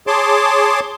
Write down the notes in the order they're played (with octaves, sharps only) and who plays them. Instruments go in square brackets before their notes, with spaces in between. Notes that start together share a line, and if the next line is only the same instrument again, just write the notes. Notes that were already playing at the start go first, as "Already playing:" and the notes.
[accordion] G#4 C#5 A5 C6 D6